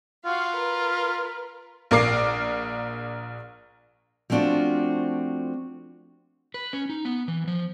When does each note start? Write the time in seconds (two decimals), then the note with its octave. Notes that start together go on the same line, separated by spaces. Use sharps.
0.25 F4 F#4 F5
0.56 A#4 B4
1.91 A#1 A#3 A#4 D6 C7
4.30 F3 A3 C4 D4 F4 F#4
6.54 B4
6.73 C#4
6.89 D#4
7.05 B3
7.28 E3
7.48 F3